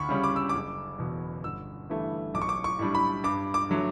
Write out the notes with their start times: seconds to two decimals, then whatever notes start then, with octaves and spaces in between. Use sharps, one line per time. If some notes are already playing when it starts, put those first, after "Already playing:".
Already playing: D2 B5 C#6
0.09 C#3 G3 C#4
0.24 D6
0.36 E6
0.49 F#1 D6
0.98 E2 B2
1.44 G1 E6
1.89 G2 E3 A3
2.34 B1 D6
2.42 C#6
2.49 D6
2.64 C#6
2.79 A2 G3 D4
2.95 B5
3.24 G2 D6
3.54 D6
3.69 D3 F#3 A3